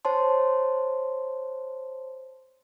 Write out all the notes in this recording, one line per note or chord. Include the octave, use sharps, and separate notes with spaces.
C5 C#5 A5 C6